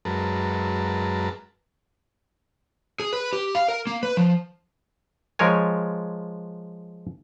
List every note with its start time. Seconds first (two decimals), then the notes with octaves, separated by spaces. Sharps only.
0.05 F#2 G#3 A#4 B4 A5
3.00 G#4
3.13 B4
3.33 G4
3.55 F5
3.68 A#4
3.87 A#3
4.03 B4
4.17 F3
5.39 F3 G#3 A#4 C#5 G#5